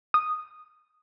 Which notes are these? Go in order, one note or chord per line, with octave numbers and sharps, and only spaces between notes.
D#6